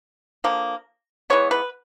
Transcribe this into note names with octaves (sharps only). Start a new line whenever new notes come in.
D3 F3 A#3
E3 G#3 B3 C#5
B4